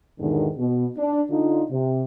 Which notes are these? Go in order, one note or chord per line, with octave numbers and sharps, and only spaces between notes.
E2 G#2 B2 D3 D#3
B2
D4
D3 D4 D#4 F4
C3